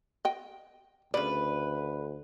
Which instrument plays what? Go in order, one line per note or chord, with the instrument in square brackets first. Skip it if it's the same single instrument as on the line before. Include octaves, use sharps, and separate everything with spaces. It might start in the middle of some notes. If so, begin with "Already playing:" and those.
[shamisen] D#5 G5
[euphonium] D2 [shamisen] C#3 D5 [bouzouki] B4